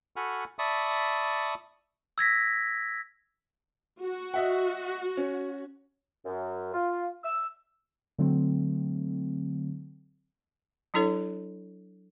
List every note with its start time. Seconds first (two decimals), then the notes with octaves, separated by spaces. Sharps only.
0.16 F#4 A4 F#5 G#5 B5 F6
0.59 D5 E5 A5 B5 C#6 D#6
2.18 E6 G#6 A#6 B6
4.01 F#4
4.34 D#5 E5 F#5
5.17 C#4
6.26 F#2
6.74 F4
7.24 E6
8.18 D3 F#3 A3 C4
10.94 F#3 D4 E4 A4 C#5